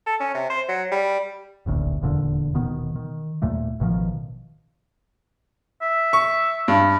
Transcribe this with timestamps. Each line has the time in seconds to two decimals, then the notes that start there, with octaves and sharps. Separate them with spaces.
0.07 A4
0.20 C#4
0.34 C3
0.50 C5
0.69 F#3
0.91 G3
1.66 E1 A1 D2 A#2
2.02 D#1 E2 A#2 D3
2.54 D#1 B2 D#3 B3
2.96 D#3
3.42 D#2 A#2 A3 A#3
3.80 A1 B2 D#3 F3
5.82 E5
6.13 C#6
6.68 G2